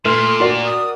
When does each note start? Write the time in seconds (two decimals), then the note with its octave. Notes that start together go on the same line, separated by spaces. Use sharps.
0.05 A#2 A3 C6 F6
0.40 F#4 A#4 D5
0.66 D#6